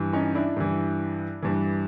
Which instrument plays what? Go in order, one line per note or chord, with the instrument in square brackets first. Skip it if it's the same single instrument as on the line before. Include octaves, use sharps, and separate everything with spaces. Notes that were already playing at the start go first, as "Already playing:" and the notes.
Already playing: [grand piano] G2 E3
C#4 D#4
D4 E4
G2 E3
G2 E3